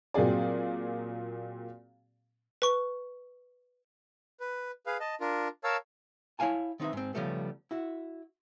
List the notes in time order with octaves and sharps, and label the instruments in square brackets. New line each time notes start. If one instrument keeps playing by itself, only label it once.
[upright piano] A#2 F#3 C4 G#4 D5
[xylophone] B4 C#6
[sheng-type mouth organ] B4
G#4 B4 F5
D#5 A5
D4 F4 A#4
A#4 C#5 F5 A5 E6
[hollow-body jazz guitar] E4 C#5 F5 G#5 A5
D#3 C4 D#4 B4 E5
G#2 C4
C#3 F3 G3 A3 B3
E4 F#4